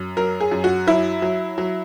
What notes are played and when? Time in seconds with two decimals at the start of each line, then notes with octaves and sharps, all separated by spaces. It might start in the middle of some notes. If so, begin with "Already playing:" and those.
Already playing: F#2
0.17 F#3 A#4
0.41 G#4
0.51 F#2
0.64 F#4
0.87 F#3 E4
1.22 F#3
1.58 F#3